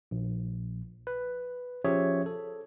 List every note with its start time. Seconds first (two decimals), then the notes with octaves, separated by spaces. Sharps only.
0.11 A#1
1.07 B4
1.84 F3 C#4 G4 G#4 C#5 E5
2.26 A4